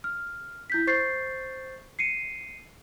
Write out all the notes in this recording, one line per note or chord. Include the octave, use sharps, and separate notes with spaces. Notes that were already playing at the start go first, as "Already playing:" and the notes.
F6
E4 G6 B6
C5 C#6 G6 A6 C7
C7 C#7 D#7